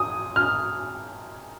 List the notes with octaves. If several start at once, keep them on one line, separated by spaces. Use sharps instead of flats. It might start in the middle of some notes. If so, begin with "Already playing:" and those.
Already playing: D#6
F6